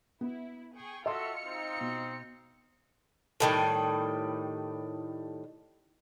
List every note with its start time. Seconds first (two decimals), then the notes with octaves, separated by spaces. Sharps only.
0.21 B3 E4
0.74 G#4 G5 C#6
1.06 F4 F#4 A4 D#5 E5 C6 F6 C#7
1.44 C4 D#4
1.81 B2
3.40 A2 D#3 G3